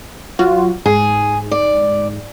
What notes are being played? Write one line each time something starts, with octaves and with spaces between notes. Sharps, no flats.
F#3 F4 F#4
G#2 G#4
D5